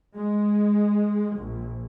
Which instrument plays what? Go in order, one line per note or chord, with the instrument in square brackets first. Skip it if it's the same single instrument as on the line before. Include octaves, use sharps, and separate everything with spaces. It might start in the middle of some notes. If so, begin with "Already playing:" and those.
[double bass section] G#3
A#1